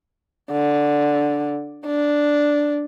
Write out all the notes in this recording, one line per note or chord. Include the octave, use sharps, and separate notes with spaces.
D3
D4